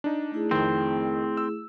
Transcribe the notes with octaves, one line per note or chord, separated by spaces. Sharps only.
D4 D#4
A3 E4 G#4
F2 D#3 C4
E6